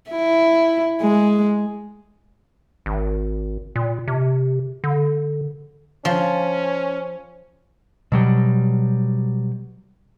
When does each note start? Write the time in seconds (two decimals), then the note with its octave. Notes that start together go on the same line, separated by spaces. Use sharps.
0.10 E4
1.01 G#3
2.86 G#1
3.76 A#2
4.08 C3
4.84 D3
6.05 F3 C#4
8.12 B2 F#3 G3